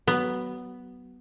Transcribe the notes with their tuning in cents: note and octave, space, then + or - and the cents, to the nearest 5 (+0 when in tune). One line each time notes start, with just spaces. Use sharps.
F#3 +25 B3 +0